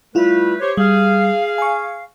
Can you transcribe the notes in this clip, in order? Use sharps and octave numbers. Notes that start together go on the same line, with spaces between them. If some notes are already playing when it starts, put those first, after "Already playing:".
G3 A3 E4 F4 B4
G4 C5 C#5
G3 G#4 F5
G#5 C#6